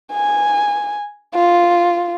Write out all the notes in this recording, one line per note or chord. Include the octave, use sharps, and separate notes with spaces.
G#5
F4